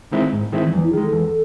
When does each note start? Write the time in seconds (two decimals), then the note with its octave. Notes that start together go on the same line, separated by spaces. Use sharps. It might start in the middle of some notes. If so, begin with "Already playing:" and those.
0.12 D#3 G#3 C4 E4
0.33 G#2
0.52 D#3 G#3 C4 E4
0.64 E3
0.73 E2 F#3
0.83 E4
0.93 D#3 G#3 G#4
1.03 A4
1.13 E2